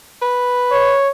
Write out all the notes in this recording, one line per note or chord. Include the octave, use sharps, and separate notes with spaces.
B4
C#5